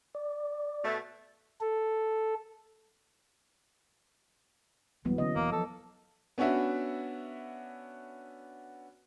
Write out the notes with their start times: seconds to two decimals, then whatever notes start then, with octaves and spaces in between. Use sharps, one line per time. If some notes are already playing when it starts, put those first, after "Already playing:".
0.15 D5
0.83 B2 A3
1.61 A4
5.05 D1 E3 F#3 G3 A#3 B3
5.18 D3 A#3 C#4 D#5
5.35 E1 E3 F#3 A#3
5.52 F3 A4
6.38 B3 C#4 D4 F#4 E5